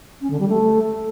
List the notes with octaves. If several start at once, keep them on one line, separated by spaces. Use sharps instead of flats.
C#4
D3
G3
A3